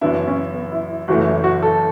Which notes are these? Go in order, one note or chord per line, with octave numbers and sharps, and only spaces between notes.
F#1 F#2 E3 B3 D4 E4
C#4
B3
E4
E4
F#1 F#2 E3 A3 F#4
E4
F#4
A4